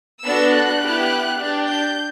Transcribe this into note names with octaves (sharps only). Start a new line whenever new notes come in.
B3 D4 F#4 A4 E6
F#6
B3 E4 G4
D4 G4
G6